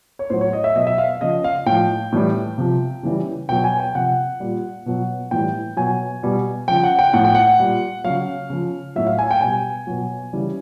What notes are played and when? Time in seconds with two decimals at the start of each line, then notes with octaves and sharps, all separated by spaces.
0.19 C#5
0.30 A2 F#3 C5
0.41 C#5
0.53 D#5
0.64 E5
0.75 B2 F#3 D#5
0.87 E5
0.98 F5
1.21 C#3 F3 D#5
1.44 F5
1.66 A2 F3 G5
2.12 A2 E3 G3
2.58 C3 F3
3.03 C#3 E3 G3
3.49 B2 F#3 G5
3.64 G#5
3.80 G5
3.95 C3 F3 F#5
4.40 A#2 G3
4.86 B2 F#3
5.31 A2 E3 G3 G5
5.77 B2 F#3 G#5
6.23 B2 G3
6.68 C#3 F3 G5
6.83 F#5
6.99 G5
7.13 A2 F3 F#5
7.24 G5
7.35 F#5
7.59 A#2 G3
8.04 C#3 F#3 F5
8.50 C#3 F3
8.96 A2 F#3 E5
9.07 F5
9.18 G#5
9.31 G5
9.41 B2 G3 G#5
9.87 B2 F#3
10.33 C#3 E3 G3